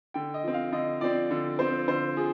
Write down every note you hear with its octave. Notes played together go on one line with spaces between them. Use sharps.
D3 G5
D#5
F3 C4
F5
D3 D#5
F3 C4 D5
D3
F3 C4 C5
D3 C5
F3 G#4